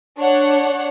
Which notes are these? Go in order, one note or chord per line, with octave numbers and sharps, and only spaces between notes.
D4 C#5 F#5